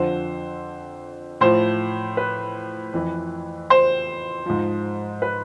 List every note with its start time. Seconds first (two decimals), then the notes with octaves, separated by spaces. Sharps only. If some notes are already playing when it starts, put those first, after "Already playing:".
Already playing: F2 D3 F3 C5
1.41 A2 F3 C5
2.17 B4
2.93 F2 E3
3.70 C5
4.46 G#2 F3
5.22 B4